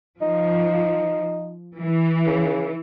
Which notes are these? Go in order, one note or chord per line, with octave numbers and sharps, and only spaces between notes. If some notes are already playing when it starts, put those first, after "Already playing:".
F3 D#4
E3
C#3